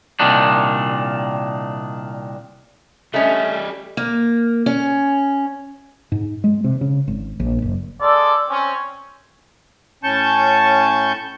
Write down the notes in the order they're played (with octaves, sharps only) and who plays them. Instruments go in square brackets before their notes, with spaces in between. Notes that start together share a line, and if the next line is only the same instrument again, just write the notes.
[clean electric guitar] C2 A#2 D#3 D4
[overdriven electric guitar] G3 D#5 [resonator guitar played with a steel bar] A3 C#4
[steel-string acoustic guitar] A#3
C#4
[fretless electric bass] G#2
G#3
C3
C#3
G#1
A#1
F#1
[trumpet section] G#3 A4 D5
C4 C#4
[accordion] A2 C#4 A5 C#6 G6